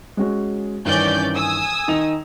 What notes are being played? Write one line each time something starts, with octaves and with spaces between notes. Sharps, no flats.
G#3 C#4 F#4
G2 D#3 E3 C#4 D5 G6
G#5 D#6 E6
D#3 D#4 F7